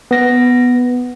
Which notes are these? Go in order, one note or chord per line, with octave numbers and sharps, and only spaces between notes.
B3 A#6